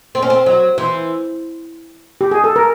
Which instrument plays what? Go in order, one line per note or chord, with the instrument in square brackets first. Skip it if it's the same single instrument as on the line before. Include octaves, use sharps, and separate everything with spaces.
[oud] C4
C#4
C4
F#3
[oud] E3 [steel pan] C5
[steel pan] G4
G#4
A4
A#4